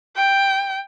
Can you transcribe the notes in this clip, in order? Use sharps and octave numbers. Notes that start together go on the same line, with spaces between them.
G5